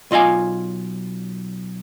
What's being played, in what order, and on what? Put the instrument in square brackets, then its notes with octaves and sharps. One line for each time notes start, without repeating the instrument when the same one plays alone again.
[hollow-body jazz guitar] B1 F4 D#5 F5 G#5